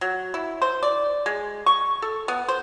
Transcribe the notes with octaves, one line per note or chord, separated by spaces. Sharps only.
F#3
E4
C5
D5
G#3
C#6
A4
B3
C5